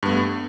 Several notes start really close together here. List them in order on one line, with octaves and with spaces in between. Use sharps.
G2 B3 A3